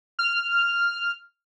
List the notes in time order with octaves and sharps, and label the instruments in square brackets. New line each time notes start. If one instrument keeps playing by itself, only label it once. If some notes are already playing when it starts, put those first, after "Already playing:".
[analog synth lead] F6